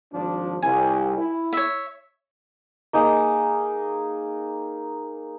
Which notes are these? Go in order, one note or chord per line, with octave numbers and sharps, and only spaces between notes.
G#1 F3 D4
C2 G#5
E4
C#5 E5
A#3 D#4 G#4